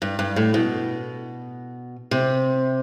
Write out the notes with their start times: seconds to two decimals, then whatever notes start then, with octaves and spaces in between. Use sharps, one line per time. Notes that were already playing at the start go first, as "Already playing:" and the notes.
0.02 G2
0.19 G2
0.36 A2
0.54 B2
2.11 C3